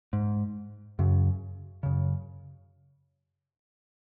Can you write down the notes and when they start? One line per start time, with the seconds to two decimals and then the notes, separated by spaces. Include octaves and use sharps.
0.13 G#2
0.99 F#2 C#3
1.83 F#2 C#3